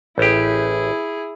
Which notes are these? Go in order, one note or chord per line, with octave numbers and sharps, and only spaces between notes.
A1 E4 G4 G#4